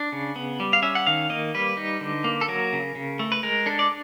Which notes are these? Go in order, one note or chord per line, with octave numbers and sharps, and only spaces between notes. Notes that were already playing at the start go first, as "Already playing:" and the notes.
Already playing: D4
C#3
B3
G3
F5
C#4 E5
F#5
D#3 F5
A#3 D#5
G3 B4
D#4
D3
A#3
A4
F#3 A#4
C#3
C#3
A3
B4
G#3 A#4
D4 A4
D5